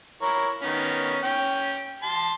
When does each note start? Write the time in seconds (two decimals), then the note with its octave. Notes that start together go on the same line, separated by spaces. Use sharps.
0.22 E4 A#4 C#5
0.62 D#3 B3 C#4
1.23 C#4 G5
2.03 A5 C6